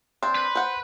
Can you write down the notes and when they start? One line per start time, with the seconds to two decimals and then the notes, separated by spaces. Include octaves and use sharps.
0.23 C4 D4 C6
0.35 B4
0.55 C5 F#5